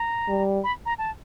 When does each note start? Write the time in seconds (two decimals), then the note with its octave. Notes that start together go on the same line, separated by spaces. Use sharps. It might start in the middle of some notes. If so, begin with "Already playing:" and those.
Already playing: A#5
0.29 G3
0.64 B5
0.86 A#5
0.98 A5